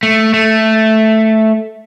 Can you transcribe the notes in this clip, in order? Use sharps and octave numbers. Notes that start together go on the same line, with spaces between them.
A3
A3